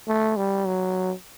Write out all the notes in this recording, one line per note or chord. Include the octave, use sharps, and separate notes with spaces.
A3
G3
F#3